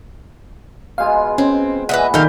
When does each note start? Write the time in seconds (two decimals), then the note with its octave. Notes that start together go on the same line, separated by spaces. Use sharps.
0.98 B2 G#3 F4 F5 G#5
1.38 C4 C#4
1.89 A#2 E3 B4 D#5 E5 F#5
2.14 D3 D#3 G4 A4 D#5 F5 G6